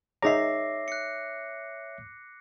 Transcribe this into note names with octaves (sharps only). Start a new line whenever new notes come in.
D#4 G#4 C#5 E5 A#5 D6 A#6 C7
F#6 C#7